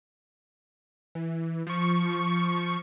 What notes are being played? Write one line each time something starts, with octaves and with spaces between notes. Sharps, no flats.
E3
F3 C#6